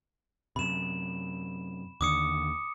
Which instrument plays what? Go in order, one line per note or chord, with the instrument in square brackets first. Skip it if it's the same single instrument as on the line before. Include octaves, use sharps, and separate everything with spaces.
[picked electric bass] F#2 C3 [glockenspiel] B5 E7
[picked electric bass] D#2 D3 [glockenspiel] D6 D#6 C#7